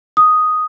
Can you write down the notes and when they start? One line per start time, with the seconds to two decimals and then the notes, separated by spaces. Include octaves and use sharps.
0.17 D#6